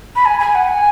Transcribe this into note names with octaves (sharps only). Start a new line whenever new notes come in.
B5
G#5
G#5
F#5
G#5